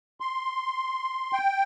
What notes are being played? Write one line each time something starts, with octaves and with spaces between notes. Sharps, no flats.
C6
G5